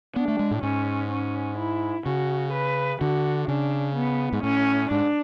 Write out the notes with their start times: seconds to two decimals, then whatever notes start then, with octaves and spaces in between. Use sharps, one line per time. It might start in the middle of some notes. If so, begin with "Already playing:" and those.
0.16 B3 D4
0.28 A3
0.39 G#3
0.51 A2
0.63 G#2 C#4
1.11 C#4
1.58 E4
2.06 C#3 F#4
2.53 B4
3.01 D3 F#4
3.48 C#3 D4
3.96 B3
4.33 G#2
4.43 A2 C#4
4.90 G#2 D4